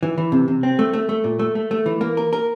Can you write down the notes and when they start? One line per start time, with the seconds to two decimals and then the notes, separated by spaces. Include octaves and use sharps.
0.03 E3
0.18 E3
0.32 C3
0.48 C3
0.63 C4
0.79 A3
0.93 A3
1.09 A3
1.24 A#2
1.39 A3
1.55 A3
1.71 A3
1.86 E3
2.01 A#3
2.17 A#4
2.33 A#4